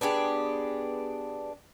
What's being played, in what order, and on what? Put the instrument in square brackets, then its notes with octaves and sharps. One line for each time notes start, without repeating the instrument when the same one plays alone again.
[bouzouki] B3 D4 G4 G#4